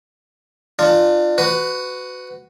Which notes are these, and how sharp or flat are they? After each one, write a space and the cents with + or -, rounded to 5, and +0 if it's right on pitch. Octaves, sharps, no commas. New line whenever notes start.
D4 +30 F4 -5
F#4 +0 B4 +25